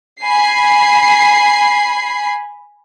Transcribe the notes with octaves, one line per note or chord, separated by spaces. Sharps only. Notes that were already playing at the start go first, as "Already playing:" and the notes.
G#5 B5 C7